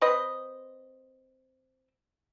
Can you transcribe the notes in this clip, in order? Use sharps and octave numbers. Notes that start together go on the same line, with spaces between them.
C4 B4 D#5